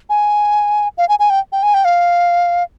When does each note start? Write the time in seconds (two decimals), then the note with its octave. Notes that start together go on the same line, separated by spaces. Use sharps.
0.10 G#5
0.98 F5
1.09 G#5
1.19 G#5
1.30 G5
1.52 G5
1.63 G#5
1.74 G5
1.85 F5